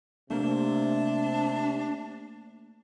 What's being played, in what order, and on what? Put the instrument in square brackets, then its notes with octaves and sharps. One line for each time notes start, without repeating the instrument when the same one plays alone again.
[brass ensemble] C3 [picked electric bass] A3 A#3 [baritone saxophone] D4